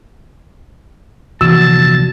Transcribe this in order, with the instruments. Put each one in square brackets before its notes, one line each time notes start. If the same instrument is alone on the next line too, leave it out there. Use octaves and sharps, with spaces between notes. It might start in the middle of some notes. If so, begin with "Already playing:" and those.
[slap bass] F1 A#1 A#2 [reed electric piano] E3 F#4 [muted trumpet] A5 [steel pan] E6